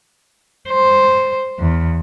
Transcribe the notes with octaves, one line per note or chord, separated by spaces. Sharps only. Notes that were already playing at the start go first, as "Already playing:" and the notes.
C5
E2